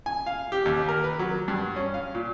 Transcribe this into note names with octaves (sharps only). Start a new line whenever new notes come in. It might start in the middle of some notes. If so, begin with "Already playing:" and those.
G#5
F5
G4
D#2
A#4
B4
F#3
G2
C#4
F5
A#2